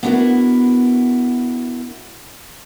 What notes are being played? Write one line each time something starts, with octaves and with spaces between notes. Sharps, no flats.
B3 D4 E4 F#4 A#4